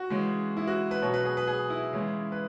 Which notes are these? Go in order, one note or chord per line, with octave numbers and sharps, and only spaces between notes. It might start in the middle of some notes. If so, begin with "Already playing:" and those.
Already playing: F#4
C#3 E3 G#3
E4
F#4
B4
B2 F#3 C#5
B4
G#4
B4
G#4
E4
C#3 E3 G#3
B4